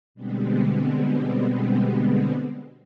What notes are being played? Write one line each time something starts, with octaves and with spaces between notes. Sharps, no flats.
B2 D3 G3 G#3 B3 C4